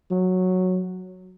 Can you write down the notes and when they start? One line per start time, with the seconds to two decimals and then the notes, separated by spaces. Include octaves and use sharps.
0.11 F#3